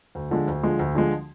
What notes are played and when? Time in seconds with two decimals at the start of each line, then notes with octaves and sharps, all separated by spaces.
0.15 D2
0.31 D3 F3 G#3
0.48 D2
0.63 D3 F3 G#3
0.79 D2
0.95 D3 F3 G#3